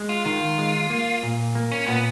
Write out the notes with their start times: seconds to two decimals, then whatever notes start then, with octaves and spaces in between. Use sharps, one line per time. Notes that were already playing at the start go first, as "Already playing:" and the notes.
Already playing: G#3
0.09 F4
0.26 D#3 F4
0.58 G#3
0.90 A#3
1.23 A#2
1.55 A#3
1.72 C#4
1.87 A#2 B3